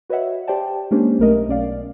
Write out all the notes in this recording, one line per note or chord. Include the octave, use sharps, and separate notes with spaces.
F#4 B4 C#5 D#5 E5 F#5
G4 C5 D5 G5 A5
G#3 A#3 C#4 D4 G4 C5
B1 A3 A#4 D#5
B1 C#4 D5 F5